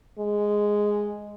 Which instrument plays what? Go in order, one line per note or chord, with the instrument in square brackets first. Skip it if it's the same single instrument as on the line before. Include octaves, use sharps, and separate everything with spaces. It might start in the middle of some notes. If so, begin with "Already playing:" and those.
[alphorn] G#3